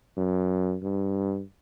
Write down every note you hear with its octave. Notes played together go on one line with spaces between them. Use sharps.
F#2
G2